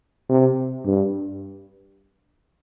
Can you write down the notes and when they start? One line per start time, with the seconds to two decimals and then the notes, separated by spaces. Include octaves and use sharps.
0.29 C3
0.85 G2